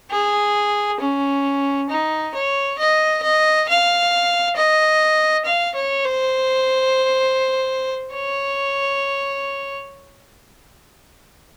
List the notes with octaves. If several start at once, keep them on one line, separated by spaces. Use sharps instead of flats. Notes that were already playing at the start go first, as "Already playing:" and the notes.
G#4
C#4
D#4
C#5
D#5
D#5
F5
D#5
F5
C#5
C5
C#5